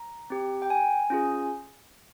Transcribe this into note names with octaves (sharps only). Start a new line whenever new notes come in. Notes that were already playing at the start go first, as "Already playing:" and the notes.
Already playing: A#5
C4 G4
G5
G#5
C#4 F4 G#4